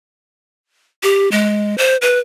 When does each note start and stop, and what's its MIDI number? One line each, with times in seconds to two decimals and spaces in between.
1.03 1.29 67
1.31 1.77 56
1.78 1.96 72
2.02 2.19 71